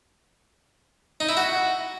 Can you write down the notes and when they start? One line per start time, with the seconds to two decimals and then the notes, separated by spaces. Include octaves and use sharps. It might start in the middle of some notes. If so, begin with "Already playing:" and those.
1.20 D#4
1.29 E4
1.37 F#4